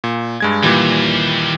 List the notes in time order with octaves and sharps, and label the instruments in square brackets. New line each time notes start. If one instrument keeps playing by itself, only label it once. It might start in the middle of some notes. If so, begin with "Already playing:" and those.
[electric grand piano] A#2
G2 G#3 G#6
[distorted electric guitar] D#2 [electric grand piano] A#2 E3 G3